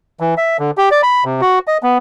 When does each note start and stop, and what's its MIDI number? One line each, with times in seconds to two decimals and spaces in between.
0.20 0.34 52
0.37 0.57 76
0.59 0.71 50
0.78 0.89 67
0.91 1.02 74
1.03 1.24 83
1.24 1.41 48
1.41 1.59 66
1.67 1.78 75
1.83 1.98 59